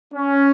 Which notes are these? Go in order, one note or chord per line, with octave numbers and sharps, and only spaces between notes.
C#4